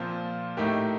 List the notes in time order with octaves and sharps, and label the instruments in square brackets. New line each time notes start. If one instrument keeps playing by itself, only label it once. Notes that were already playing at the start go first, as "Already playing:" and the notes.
Already playing: [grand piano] A#2 F3 C4 F4
A2 A3 D#4 G4 A#4